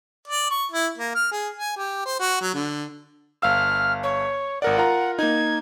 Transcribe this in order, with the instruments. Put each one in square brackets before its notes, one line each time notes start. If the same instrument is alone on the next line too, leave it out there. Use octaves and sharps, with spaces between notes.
[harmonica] D5
C#6
E4
A#3
F6
G#4
G#5
G4
C5
F#4
F#3
D3
[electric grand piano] G1 F5 E6 [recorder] F6
[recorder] C#5
[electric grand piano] G#1 A#4 D5 [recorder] F#5
[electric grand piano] F4 A#4 A#5
[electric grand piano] A#3 D#4 [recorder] G#6